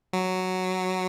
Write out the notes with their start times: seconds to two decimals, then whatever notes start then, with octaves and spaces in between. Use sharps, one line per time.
0.13 F#3